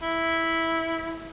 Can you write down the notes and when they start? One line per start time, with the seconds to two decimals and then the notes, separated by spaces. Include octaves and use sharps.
0.02 E4